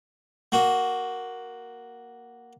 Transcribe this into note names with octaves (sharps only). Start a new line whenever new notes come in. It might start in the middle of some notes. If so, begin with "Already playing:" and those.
A#3 F#4